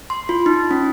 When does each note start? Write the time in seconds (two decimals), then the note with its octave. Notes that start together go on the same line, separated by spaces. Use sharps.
0.10 C6
0.29 F4
0.46 D#4
0.71 C#4